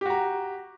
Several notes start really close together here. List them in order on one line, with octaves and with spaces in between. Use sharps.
G4 F#4 A#5